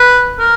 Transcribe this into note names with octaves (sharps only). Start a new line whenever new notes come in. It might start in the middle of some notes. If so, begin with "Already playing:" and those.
Already playing: B4
A#4